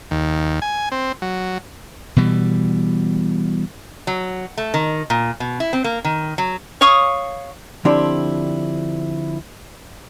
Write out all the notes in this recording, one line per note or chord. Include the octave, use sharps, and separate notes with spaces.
D#2
G#5
C4
F#3
B2 E3 G3
F#3
A3
D#3
A#2
B2
E4
C4
A#3
D#3
F#3
C#5 F5 C#6 D#6
D3 F3 C4 D4 E4 G4